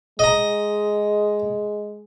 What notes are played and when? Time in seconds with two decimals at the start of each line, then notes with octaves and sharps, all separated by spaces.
0.19 G#3 D#5 A#5